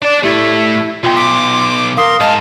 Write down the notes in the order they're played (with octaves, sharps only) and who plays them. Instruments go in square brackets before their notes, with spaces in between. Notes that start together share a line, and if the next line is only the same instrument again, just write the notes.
[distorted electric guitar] D4 A5 [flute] D5
[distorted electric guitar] A2 A3 [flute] E4 [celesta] G4
[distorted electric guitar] B1 [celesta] F4 G5 [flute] C6
[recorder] D6 [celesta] B6
[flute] A#4 [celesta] F5 D#6 C7 [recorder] C6
[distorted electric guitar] G#2 [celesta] D#5 [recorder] F5 [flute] A5